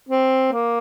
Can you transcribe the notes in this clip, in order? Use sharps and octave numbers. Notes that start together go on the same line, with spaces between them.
C4
A#3